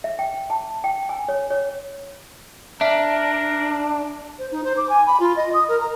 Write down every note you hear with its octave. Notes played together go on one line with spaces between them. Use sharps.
E5
G5
A5
G5
G#5
C#5
C#5
D4 A#4 E5
C5
D#4
C5
D6
G#5
B5
F4
D#5
D#6
A#4
A#5